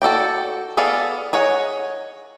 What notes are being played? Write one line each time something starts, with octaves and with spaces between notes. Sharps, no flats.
F#4 A4 D5 G5
B3 G#4 A4 D5 F5
G#4 C#5 D#5 F#5